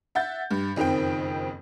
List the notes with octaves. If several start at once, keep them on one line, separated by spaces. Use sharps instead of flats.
E5 F#5 G6 A6
G2
F#1 F2 D#3 C4 G5